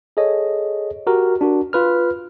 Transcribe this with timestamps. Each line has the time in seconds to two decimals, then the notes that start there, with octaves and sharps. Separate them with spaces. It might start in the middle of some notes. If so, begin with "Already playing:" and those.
0.17 G#4 A4 C#5 D#5
1.07 F#4 G4 A#4
1.41 D4 F#4 A#4
1.73 F4 B4 F6